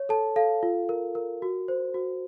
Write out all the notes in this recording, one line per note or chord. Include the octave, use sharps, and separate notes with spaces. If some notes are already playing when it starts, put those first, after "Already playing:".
Already playing: C#5
A4 A5
A4 F5
F4
A#4
A#4
F#4
C5
F#4